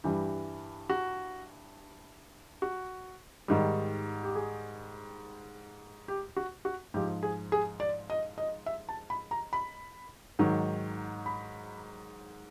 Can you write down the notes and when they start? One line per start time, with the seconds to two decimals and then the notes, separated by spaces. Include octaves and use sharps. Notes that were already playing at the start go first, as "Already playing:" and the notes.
0.04 G2 E3 G3 G4
0.90 F#4
2.62 F#4
3.48 G#2 D#3 G3
4.23 G4
4.35 G#4
6.08 G4
6.37 F#4
6.65 F#4
6.94 G#2 F3 G4
7.23 G#4
7.52 G#4
7.80 D5
8.10 D#5
8.38 D#5
8.66 E5
8.89 A5
9.10 B5
9.31 A#5
9.53 B5
10.39 G#2 D#3 F#3
11.26 B5